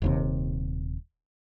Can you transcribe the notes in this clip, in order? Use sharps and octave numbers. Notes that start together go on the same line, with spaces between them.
D#1 D#2 C3